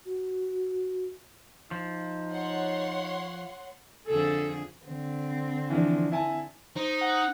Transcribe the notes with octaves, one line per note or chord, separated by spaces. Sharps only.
F#4
F3 D#4
C#5 F#5 C6
F2 D3 G#4 A4
D3 C4
E3 F3 D4
E4 G#5 A5
D#4 C5
F#5